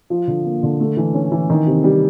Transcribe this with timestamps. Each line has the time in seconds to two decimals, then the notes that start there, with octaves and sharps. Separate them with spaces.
0.10 F3
0.27 D3
0.45 A#3
0.63 D3
0.80 A3
0.97 E3
1.14 C#4
1.32 E3
1.50 D#3
1.66 C3
1.84 G3